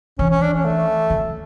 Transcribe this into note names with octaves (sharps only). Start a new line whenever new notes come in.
E3 C#4
C#4
D4
C#4
A3
D3